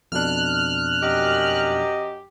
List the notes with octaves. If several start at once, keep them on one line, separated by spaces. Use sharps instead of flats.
F2 B2 D4 F6 F#6
F#2 G4 D#5